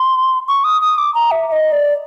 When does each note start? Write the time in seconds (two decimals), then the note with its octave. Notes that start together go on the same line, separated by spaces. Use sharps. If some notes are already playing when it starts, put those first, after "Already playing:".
Already playing: C6
0.48 C#6
0.64 D#6
0.81 D#6
0.98 D6
1.15 A#5
1.31 E5
1.48 E5
1.52 D#5
1.72 D5